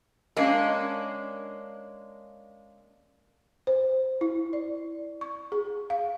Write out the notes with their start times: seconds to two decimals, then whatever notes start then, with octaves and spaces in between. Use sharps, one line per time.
0.37 G#3 A#3 C#4 D4
3.67 C5
4.21 E4
4.53 D5
5.21 C#6
5.52 G#4
5.90 F5